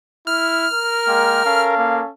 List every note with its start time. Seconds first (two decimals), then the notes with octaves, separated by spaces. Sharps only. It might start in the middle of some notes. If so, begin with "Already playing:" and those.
0.27 E4 F6
0.73 A#4
1.06 G#3 A#3 G5
1.44 C#4 A4 F5
1.78 A#3